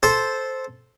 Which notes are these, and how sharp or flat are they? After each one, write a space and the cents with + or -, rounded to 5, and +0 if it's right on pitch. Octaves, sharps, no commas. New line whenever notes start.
A4 -10 C5 +0